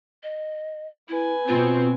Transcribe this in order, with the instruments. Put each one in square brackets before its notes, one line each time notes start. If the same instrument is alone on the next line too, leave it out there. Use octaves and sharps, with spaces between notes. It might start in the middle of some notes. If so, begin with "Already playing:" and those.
[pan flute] D#5
[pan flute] E4 [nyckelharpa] B4 G#5
[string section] B2 C4 [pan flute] F4